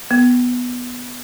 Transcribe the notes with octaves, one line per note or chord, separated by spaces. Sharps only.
B3